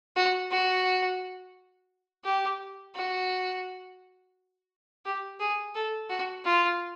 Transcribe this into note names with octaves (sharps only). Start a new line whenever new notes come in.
F#4
F#4
G4
F#4
G4
G#4
A4
F#4
F4